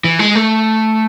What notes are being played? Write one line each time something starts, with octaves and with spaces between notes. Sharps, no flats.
E3
G#3
A3